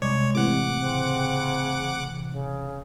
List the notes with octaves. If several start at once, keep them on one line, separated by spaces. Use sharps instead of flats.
C2 G#3 C#5 D5 G#6
A2 C3 E3 F#5 D6
C#3 C4
C#3